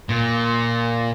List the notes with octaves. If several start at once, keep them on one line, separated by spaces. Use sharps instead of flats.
A#2